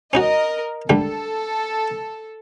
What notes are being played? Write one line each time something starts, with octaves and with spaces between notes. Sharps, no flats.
C#4 D#4 F#4 A#4 D#5
D3 G3 A3 A4